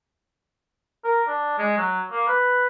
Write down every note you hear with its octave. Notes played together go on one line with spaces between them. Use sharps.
A#4
D4
G#3
F#3
A#3
B4